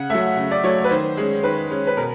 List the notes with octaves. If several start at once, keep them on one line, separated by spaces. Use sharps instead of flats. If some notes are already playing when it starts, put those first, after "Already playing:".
Already playing: C#3 F#5
F#3 A3 E5
C#3
D5
F#3 A3 C#5
B4
D#3 C5
G#3 C#4
D#3 B4
G#3 C#4
B4
B2 A#4